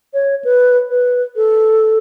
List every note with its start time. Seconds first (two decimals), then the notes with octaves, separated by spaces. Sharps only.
0.14 C#5
0.44 B4
0.90 B4
1.36 A4